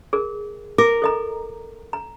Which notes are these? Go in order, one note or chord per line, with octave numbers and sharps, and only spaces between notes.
G#4 A#4
A#4 D6
A4 D#5 A#5
A#5